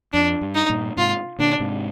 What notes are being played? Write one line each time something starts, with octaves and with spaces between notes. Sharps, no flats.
F2 D4
G2
D#4
G2 A#2
G#2 C3 F4
A#2 D3 D4
G#2 C3